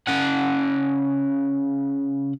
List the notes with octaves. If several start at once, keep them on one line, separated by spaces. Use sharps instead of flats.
C#3 F#5